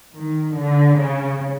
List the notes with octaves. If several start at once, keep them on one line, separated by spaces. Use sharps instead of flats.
D#3
D3
C#3